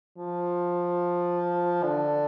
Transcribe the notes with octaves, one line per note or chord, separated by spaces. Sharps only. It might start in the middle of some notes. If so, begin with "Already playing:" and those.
F3
D3